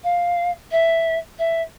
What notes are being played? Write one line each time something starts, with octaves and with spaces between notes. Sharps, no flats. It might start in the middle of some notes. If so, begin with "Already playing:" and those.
F5
E5
E5